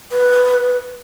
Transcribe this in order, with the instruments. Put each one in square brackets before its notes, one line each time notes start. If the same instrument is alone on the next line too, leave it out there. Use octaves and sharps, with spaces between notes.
[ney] B4